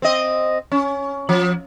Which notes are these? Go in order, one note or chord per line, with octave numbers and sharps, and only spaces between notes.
C4 D#5
C#4
F3